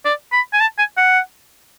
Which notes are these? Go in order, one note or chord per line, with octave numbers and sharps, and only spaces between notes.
D5
B5
G#5
A5
G#5
F#5